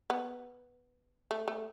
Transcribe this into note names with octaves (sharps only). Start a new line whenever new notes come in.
B3
A3
A3